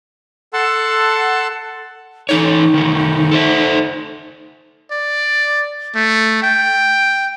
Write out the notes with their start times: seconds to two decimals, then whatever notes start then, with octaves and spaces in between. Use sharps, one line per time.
0.53 A4 F#5 A5 C6 E6
2.29 E3 D#4 A4 C#5
2.74 D#3 A3
3.31 A4 C5 E5
4.92 D5
5.96 A3
6.43 G5